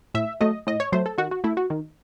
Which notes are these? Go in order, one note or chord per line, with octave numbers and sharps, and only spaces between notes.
A2 E5
F#3 A3 D#5
A2 D#5
C#5
F#3 A3 C5
A4
D#3 F#4
F#4
A3 E4
F#4
D#3